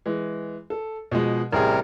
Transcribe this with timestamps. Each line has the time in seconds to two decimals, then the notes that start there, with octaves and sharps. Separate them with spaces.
0.06 E3 G#3
0.70 A4
1.11 B2 F3 G#3
1.53 A1 C3 G3 G#4 A#4